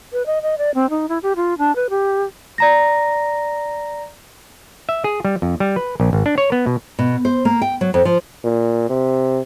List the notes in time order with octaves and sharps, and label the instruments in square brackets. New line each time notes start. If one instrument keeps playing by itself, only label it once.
[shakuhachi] B4
D#5
D#5
D5
C4
D#4
E4
G4
F4
D4
B4
G4
[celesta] D5 A#5 A#6
[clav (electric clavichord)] E5
G#4
G3
F2
G3
B4
A#1
G#1
D4
C#5
B3
B2
[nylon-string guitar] B2
C5
A#3
G5
F#3
F2
F3
[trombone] A#2
C3